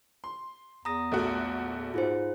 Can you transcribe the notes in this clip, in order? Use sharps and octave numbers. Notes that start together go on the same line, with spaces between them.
C6
E2 A#5 D#6 A#6
A#1 A3 F#4
G#2 F4 G#4 C5